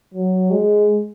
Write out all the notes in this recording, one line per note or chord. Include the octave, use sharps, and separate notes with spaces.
F#3
G#3